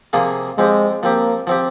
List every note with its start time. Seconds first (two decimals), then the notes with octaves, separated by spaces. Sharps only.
0.13 C3 F3 A#3 F4 G#4
0.58 F3 G#3 C4 G4
1.02 F3 A#3 C4 G4
1.47 F3 C4 G4